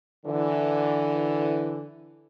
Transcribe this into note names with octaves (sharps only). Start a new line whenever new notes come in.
D3 E3